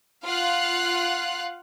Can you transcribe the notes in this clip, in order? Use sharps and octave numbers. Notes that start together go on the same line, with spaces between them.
F4 F5 F#5 F#6 C7